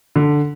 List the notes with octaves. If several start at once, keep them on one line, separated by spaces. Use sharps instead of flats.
D3